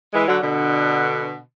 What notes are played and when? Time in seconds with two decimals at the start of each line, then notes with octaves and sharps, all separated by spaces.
0.13 E3 G#3
0.28 D3 F#3
0.42 B2 D3